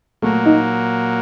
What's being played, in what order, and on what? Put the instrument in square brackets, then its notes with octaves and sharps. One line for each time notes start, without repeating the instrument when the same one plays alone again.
[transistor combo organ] A#2 F#3 A#3 [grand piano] A3
[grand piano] D#4